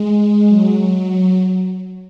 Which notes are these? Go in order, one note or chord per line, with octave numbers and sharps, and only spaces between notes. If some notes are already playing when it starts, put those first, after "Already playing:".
Already playing: G#3
F#3